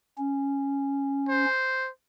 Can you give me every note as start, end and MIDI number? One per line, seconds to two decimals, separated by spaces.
0.18 1.45 61
1.29 1.89 72